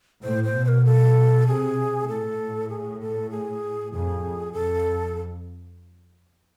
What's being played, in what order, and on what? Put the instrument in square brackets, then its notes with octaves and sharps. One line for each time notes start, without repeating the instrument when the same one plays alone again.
[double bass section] A2 [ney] C5
[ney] C5
[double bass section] B2
[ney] C5
A#4
A4
[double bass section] C3 [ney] G#4
[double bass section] A2 [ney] A4
[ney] G#4
A4
G#4
[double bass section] F2 [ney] G#4
[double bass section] F2 [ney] A4